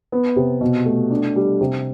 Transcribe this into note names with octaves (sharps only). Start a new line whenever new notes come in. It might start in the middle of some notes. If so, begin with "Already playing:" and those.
B3
C3
B2
A3
D4
G3
C3